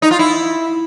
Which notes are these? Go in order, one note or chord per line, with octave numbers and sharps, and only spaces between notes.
D#4
F4
E4